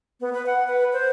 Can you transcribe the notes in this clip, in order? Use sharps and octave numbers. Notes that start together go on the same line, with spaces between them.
B3
B4
F#5
B4
C5